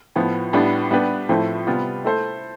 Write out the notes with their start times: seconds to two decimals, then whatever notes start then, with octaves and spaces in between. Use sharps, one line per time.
0.16 A2 F3 B3
0.53 A2 G3 B3 D4
0.91 G3 B3 D4 G4 B4
1.29 A2 F3 A3 C4 E4
1.67 C3 G3 B3 F4
2.04 A3 E4 A4 C5